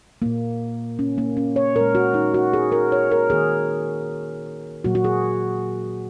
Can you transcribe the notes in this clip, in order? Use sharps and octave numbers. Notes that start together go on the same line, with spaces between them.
A#2 A#3
C#4
A#3
C#4
C#5
A#2 G#3 A#4
F#4
D#4
F#4
G#4
A#4
C#5
A#4
D#3 A#3 G#4
A#2 F#3 A#3 F#4
F#4
G#4